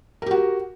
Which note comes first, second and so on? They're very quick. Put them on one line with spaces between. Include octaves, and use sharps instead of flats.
A#4 G4 F#4